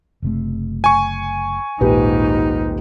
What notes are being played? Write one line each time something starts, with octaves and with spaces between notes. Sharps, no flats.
F#1 C3 A3
G#5 C#6
D#1 A#1 G#2 D#4 G4 B4